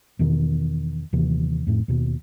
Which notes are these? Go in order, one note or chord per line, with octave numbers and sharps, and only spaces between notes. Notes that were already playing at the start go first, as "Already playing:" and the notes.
E2 B2 D#3
D#1 D#2 C3 E3
F2 A2
D#2 B2